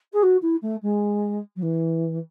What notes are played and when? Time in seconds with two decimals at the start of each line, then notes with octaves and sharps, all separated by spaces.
0.13 G#4
0.22 F#4
0.42 E4
0.62 A3
0.82 G#3
1.56 F#3
1.62 E3